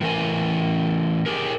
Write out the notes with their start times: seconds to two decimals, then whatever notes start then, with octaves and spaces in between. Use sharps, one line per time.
0.01 A2 E3 A#4 G#5
1.26 G4 G#4 A#4